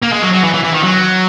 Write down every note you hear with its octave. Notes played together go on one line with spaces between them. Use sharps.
A#3
G#3
F#3
F#3
E3
E3
E3
D#3
F#3